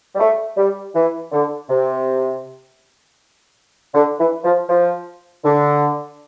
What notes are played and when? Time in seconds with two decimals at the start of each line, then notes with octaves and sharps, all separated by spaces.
0.15 G3
0.20 A3
0.57 G3
0.95 E3
1.32 D3
1.69 C3
3.95 D3
4.19 E3
4.44 F3
4.69 F3
5.44 D3